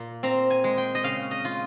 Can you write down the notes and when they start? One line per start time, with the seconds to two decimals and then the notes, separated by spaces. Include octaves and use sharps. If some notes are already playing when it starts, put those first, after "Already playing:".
Already playing: A#2
0.23 C4 A#5
0.50 G#5
0.64 G#3
0.78 G5
0.95 D#5
1.04 C#3 F5
1.31 D#5
1.45 F4